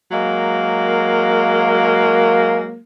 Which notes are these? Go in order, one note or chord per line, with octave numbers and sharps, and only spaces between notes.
F#3 G#3 A#3